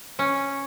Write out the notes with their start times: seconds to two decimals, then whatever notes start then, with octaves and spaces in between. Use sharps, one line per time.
0.19 C#4